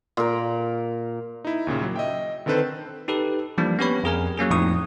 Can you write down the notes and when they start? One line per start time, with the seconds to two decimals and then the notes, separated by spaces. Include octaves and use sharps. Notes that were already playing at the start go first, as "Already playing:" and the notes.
0.17 A#2 A#4
1.45 D#4 E4
1.67 D#2 A#2 C#3
1.83 F#3
1.96 D#5 E5 G5
2.46 D3 D#3 C4 A4 B4 C5
3.08 D#4 G4 A4 B4
3.58 E3 F3 G3 A#3 D4
3.79 B3 C#4 G4 B4 C#5 B5
4.03 F2 G#4 A#4 G#5
4.37 F#3 A#3 C#4 G#4
4.50 F2 A2 F3 D#4 C#6 D#6